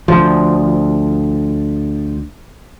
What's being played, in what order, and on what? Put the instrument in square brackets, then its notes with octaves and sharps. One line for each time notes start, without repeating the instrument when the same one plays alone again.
[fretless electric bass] D2 F3